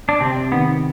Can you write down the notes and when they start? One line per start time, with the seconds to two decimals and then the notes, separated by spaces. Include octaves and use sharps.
0.09 D4
0.20 C3 C4
0.52 D#3 B3